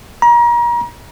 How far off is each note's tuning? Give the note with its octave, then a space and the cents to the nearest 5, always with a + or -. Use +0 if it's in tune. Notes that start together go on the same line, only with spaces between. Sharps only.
A#5 +35